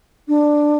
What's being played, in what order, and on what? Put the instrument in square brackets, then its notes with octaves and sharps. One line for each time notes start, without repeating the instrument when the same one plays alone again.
[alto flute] D4